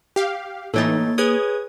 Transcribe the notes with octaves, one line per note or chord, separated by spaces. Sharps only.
G4 F5
A2 E3 A#3 D#4 A4 C#5 A6
G#4 B4 C#5 D#6 G#6